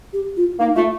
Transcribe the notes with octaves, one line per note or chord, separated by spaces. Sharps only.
G4
F4
A#3 D#4
A3 F4